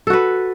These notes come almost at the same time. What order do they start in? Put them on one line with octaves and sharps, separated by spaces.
A4 F#4 B4